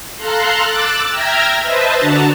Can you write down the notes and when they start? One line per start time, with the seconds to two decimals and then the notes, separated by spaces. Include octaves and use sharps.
0.18 A4 F5 A#5 C6 F#6
0.64 D6 E6 F#6 A6
1.10 E5 G5 A#5 F6 G#6 A#6
1.62 B4 C5 D#5 E5 A5
1.98 D3 D4 F#4 A5 A#5